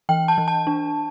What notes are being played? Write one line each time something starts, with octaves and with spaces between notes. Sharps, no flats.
E3 G5
A5
E3
A5
D4